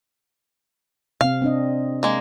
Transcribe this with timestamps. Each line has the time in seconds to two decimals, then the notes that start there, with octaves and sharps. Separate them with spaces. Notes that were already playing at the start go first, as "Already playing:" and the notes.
1.21 C3 C4 F5
1.42 C4 D4 D#5
2.03 G#3 A#3